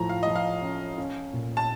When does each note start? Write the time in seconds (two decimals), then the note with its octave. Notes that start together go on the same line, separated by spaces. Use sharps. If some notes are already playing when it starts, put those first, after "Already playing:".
Already playing: A2 F3 A#5
0.09 F5
0.23 F3 D#5
0.36 F5
0.63 C#4
0.98 C#4
1.33 A#2
1.57 A5